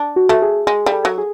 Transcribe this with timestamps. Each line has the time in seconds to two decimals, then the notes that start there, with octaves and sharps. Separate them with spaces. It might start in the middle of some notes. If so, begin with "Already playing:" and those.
Already playing: D4
0.16 F#4
0.29 A3
0.42 G#4
0.67 G#3 G#4
0.86 G3
0.92 A4
1.05 F#3
1.18 G#4